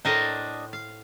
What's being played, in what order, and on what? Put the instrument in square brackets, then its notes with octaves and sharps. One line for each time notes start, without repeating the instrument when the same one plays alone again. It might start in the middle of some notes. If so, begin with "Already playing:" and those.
[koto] A2 A#4 C5 [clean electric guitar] D4 D#5
[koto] F5